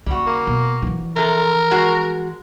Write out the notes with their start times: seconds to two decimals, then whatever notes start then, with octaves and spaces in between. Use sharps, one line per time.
0.06 D#2 C#3 G3 F#4
0.27 A#3
0.47 B2
0.82 E3 F3
1.16 C3 A4 A#4
1.71 G#3 F#4